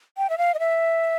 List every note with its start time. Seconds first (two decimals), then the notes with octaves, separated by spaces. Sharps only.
0.18 G5
0.30 E5
0.38 F5
0.54 D#5
0.59 E5